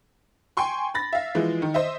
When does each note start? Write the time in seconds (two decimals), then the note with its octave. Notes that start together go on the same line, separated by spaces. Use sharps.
0.57 G5 G#5 C6 C#6
0.95 B5 A6 A#6
1.13 E5 F5
1.35 E3 F3 G#3
1.62 D#3
1.74 C5 D#5 E5